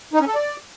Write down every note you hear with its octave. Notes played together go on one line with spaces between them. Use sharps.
D#4
C#4
A4
D5